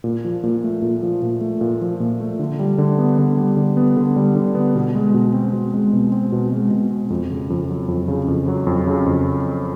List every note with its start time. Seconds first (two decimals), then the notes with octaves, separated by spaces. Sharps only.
0.04 A#2
0.25 F3
0.43 A#2
0.64 A3
0.82 A#2
1.02 F3
1.22 A#2
1.41 A3
1.61 A#2
1.81 F3
2.00 A#2
2.20 A3
2.39 D3
2.59 G3
2.78 D3
2.99 B3
3.19 D3
3.37 G3
3.57 D3
3.77 B3
3.97 D3
4.16 G3
4.35 D3
4.55 B3
4.75 B2
4.95 G#3
5.14 B2
5.33 C4
5.53 B2
5.74 G#3
5.93 B2
6.12 C4
6.32 B2
6.52 G#3
6.71 B2
6.90 C4
7.10 F2
7.31 C#3
7.50 F2
7.69 F#3
7.88 F2
8.08 C#3
8.28 F2
8.48 F#3
8.67 F2
8.87 C#3
9.06 F2